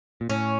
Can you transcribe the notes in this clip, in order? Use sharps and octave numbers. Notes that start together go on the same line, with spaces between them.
A#2
A2 C#4